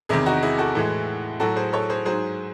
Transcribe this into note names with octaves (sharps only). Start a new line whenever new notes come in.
E2 C3 D#3 E4 G#4
D#4 F#4
E4 G#4
F#4 A4
A2 E3 G#3
A2 F#3 F#4 A4
G#4 C5
A4 C#5
G#4 C5
G#2 F#3 G#4 C5